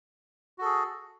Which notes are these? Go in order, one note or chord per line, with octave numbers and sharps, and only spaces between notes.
F#4 G#4 A4